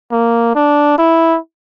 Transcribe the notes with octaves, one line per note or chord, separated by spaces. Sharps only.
A#3
D4
E4